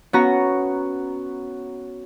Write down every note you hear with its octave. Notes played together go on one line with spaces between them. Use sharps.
B3 C#4 F#4 A#5